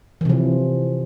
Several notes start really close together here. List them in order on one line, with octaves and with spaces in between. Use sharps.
E3 C3 F3